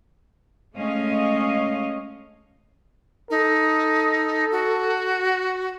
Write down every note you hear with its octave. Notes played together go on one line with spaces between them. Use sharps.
G#3 A3 C#4 D#5 F5
D#4 A4
F#4